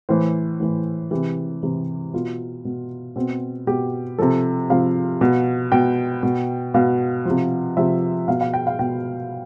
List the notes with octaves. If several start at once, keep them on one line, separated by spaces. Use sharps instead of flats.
A2 E3 C5
A2 E3
C3 E3 G4
C3 E3
B2 F4
B2
B2 C4
B2 G4
C3 F3 A4
C3 F3 F5
B2
B2 G5
B2
B2 F5
C3 F3
C3 F3 E5
B2 F5
F5
G5
F5
B2 G5